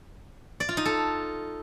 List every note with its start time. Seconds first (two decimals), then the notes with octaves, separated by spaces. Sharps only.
0.60 D5
0.69 F4
0.77 D#4
0.85 A4